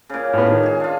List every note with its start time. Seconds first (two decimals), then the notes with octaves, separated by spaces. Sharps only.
0.10 A#2 C#3
0.33 A2 B3
0.50 D#3
0.63 G#3 G#4
0.80 D4 F4